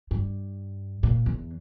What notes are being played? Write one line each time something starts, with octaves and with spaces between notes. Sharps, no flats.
G2
A#2
E2